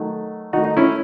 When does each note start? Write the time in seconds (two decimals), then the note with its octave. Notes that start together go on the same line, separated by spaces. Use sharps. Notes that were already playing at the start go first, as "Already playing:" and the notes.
Already playing: D#3 F#3 A3
0.53 D#3 A3 D#4 F#4
0.65 D#4
0.77 C#4 E4